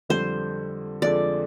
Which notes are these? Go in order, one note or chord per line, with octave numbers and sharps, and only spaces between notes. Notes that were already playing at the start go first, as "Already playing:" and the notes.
F2 D3 G3 C5
F2 D3 F3 G#3 C4 D5